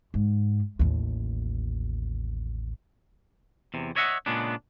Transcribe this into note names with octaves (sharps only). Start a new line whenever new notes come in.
G#2
A1 D#2
E2 C3
C#5 D#5 E5 F#5
A#2 C#3 G#3 B3 D4